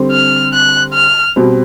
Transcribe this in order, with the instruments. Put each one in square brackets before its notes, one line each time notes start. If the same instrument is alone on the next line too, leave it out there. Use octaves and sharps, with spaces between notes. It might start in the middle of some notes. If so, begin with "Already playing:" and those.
Already playing: [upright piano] D3 G3 C4
[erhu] F6
F#6
F6
[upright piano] B2 G3 C4